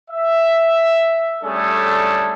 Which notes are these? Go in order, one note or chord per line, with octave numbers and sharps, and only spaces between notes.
E5
G3 A3 C#4 D4 G#4 A4